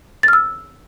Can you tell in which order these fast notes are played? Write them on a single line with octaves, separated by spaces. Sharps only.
A6 F6 E6